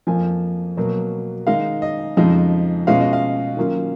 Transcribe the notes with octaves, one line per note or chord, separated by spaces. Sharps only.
F2 F3 A#3 G#5
B2 F#3 A#3
D#3 G#3 D#4 F5
D#5
F2 C#3 F3 G#3 D#4
B2 G#3 C#4 F4 F5
D#5
F5
D#3 F#3 A#3 C#4 F4